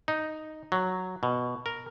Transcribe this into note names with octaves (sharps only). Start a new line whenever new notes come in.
D#4
F#3
B2
A#4